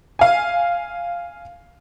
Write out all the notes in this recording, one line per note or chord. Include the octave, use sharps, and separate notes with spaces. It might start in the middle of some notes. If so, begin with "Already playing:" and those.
F5 G#5